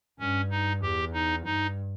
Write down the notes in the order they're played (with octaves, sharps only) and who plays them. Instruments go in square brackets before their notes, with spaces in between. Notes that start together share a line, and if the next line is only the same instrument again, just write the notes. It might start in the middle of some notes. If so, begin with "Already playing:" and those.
[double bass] G2 [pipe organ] C#4
[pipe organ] D#4
[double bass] E2 [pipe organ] G4
[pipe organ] D#4
[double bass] G2 [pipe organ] D#4